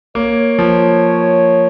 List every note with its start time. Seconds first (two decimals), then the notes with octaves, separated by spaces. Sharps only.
0.15 A#3 C#5
0.59 F3